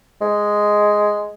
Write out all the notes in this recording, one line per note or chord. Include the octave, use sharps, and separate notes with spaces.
G#3